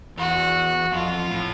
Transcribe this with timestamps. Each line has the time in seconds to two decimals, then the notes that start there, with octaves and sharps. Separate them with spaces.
0.17 E2 F#4
0.93 F2 F4
1.31 A2